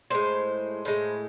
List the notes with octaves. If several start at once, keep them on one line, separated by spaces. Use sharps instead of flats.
A2 G#3 C5
A2 G#3